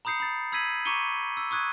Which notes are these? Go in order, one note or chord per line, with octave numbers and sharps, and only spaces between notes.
A#5 B5 D#6 G6 C7 C#7
B5 A6
B5 E6 G#6 B6 D#7 F#7
A#5 C#6 D6 C#7 D#7 G7
E6
C#6 D#6 F#6 G#6 D#7